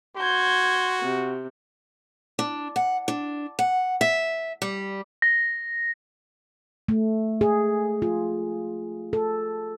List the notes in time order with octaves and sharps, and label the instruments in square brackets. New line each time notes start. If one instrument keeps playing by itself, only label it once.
[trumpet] F#4 [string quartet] C6 G6 G#6
[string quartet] C3
[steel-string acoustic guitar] D4
F#5
D4
F#5
E5
G3
[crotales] A#6
[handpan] A3
G#4
F4
A4